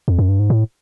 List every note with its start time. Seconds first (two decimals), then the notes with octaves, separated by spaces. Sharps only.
0.08 F2
0.19 F#2
0.29 G2
0.39 G#2
0.50 A2